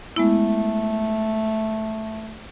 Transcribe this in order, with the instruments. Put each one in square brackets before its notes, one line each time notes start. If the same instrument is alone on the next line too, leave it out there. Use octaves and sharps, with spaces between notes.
[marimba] G#3 B3 E4 [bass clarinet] A3